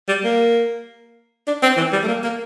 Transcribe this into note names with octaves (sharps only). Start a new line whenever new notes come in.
G3
A#3
D4
C4
E3
G3
A3
A#3
A#3